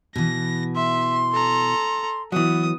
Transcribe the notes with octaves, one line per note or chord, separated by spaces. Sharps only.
B2 E3 A#6
E5 C6
A4 A#5
E3 F#3 B3 D#6